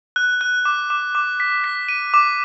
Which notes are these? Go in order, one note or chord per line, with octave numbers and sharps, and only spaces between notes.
F#6
F#6
D6
D6
D6
B6
B6
D#7
D6